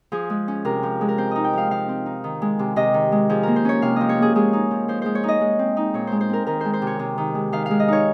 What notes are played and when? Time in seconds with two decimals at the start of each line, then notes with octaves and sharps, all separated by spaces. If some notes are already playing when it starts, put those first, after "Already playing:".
0.12 F3 G#4
0.30 G#3
0.48 C#4
0.65 C3 A#4
0.83 F3
1.01 G#3
1.08 A#4
1.18 C4 C5
1.31 D#4 D#5
1.44 G5
1.53 F3 F5
1.71 F3 F5
1.89 C4
2.06 D#4
2.24 D#3
2.42 G#3
2.59 C3
2.76 C3 D#5
2.94 D#3
3.12 G#3
3.30 F3 G#4
3.43 A#3 A#4
3.56 C5
3.65 C#4 C#5
3.82 C3 F5
3.96 F3 D#5
4.09 C#5
4.18 A#3 G#4
4.36 G#3 G#4
4.53 D#4
4.71 F3
4.88 F3 C5
5.02 G#3 C5
5.15 C#5
5.23 D#4 D#5
5.41 G#3
5.59 C4
5.77 D#4
5.94 A#2 C#5
6.07 G#3 C5
6.21 C5
6.29 C4 A#4
6.46 D#3 A#4
6.61 G#3 C5
6.74 C5
6.82 C3
6.87 C#5
6.99 C3
7.18 D#3
7.35 G#3
7.52 D#3 F5
7.66 G#3 F5
7.79 D#5
7.88 D#4 C#5